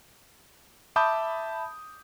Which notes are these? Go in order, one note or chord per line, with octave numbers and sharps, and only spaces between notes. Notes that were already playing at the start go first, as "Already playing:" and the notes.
E5 A5 B5 D6 D#6 G6